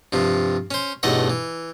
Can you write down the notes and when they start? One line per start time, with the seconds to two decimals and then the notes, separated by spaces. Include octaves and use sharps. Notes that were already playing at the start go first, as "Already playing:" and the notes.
0.13 G2 C3 F3
0.71 C#4 C5
1.03 B1 E2 G2 A3 D#5 F#5
1.30 E3